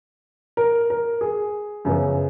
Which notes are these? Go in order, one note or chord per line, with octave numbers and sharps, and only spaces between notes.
A#4
A#4
G#4
F#2 C#3 F3 B3